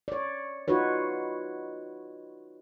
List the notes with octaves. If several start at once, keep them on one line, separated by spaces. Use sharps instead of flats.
C#5 D5
D#4 F4 F#4 B4 C#5